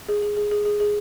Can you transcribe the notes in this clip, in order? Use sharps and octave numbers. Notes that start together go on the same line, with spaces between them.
G#4
G#4
G#4
G#4
G#4
G#4